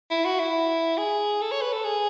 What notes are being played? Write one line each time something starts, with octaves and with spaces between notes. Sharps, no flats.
E4
F#4
E4
G#4
A4
C#5
B4
A4
G#4